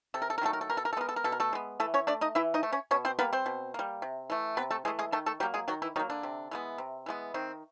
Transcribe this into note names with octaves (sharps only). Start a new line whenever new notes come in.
C3 A4
A#4
A4
A#4
D#3 F#3 A3 A4
A#4
A4
B2 A#4
A4
A#4
A4
G#3 B3 A#4
A4
A#4
B2 A4
A#4
A3 A4
G#3 B3
E3 A3 A4
C#4 C#5
A3 D4 D5
D#4 D#5
E3 E4 E5
D#4 D#5
A3
C#4 C#5
B2 C#4 C#5
C4 C5
G3 A#3 B3 B4
C4 C5
B2
G3 A#3
C3
E3 A3
C3 B3 B4
A3 A4
E3 G#3 A3 G#4
G#3 G#4
D#3 A3 A4
A3 A4
F#3 G3 A#3 G4
G#3 G#4
D#3 F#3 F#4
E3 E4
D#3 F#3 A#3 D#4
D3 D4
C3
E3 G#3 B3
C3
E3 G#3 B3
D#3 C4